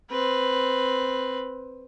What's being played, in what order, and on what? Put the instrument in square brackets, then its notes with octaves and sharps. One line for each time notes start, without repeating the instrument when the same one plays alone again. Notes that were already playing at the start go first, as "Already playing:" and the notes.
[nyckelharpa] C4 B4